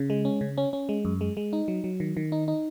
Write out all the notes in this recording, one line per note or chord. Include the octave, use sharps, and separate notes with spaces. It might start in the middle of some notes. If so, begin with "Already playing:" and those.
Already playing: C#3
G#3
C#4
C#3
C#4
C#4
G#3
F#2
G#3
G#3
D#4
F#3
F#3
D#3
D#3
D#4
D#4